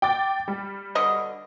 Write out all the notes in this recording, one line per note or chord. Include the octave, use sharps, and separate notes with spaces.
G5 D6 A6
G3
B2 D3 D#5